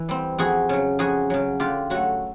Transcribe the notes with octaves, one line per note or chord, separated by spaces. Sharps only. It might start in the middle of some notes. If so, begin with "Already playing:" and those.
Already playing: E3
G3 C4
F2 F#4 G#4
C#3 F#3
F2 F#4 G#4
C#3 F#3
D3 F4 G4
F#3 A3 F#4